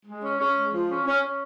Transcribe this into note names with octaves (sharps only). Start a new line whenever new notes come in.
G#3
C#4
C#4
G#3
F3
C#4
C#4
C#4